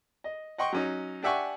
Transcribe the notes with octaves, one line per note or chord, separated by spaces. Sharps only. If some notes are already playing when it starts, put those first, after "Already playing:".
D#5
D#5 F#5 G5 C6 C#6
F#3 C#4 D#4
D4 G4 E5 F#5 G#5 C#6